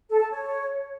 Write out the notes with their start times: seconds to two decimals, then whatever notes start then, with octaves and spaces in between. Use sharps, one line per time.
0.09 A4
0.20 A5
0.32 C#5